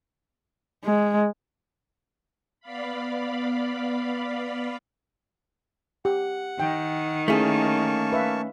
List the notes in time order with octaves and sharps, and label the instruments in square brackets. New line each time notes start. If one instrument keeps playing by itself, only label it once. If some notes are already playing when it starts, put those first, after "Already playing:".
[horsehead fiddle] G#3
[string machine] B3 D5 F5 B5
[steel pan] G4 [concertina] F#5
[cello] D#3 [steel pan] G5
[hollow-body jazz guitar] A3 C#4 [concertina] A#3 A5 C#6 [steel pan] E4 G#4
[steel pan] B4 E5 F5